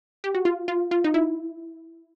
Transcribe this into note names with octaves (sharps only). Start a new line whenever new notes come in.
G4
F#4
F4
F4
F4
D#4
E4